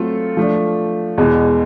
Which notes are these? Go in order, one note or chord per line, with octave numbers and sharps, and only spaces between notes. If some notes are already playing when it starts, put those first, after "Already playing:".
Already playing: F#3 A3 C4 F4 A4
F3 A3 D4
E2 B2 G#3